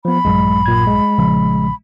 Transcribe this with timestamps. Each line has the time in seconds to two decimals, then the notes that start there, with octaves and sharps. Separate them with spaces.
0.05 F3 B3 B5
0.25 A#1 G2 F#3 G#3
0.66 A#2 G#6
0.87 G#3
1.18 A#1 C#3 F3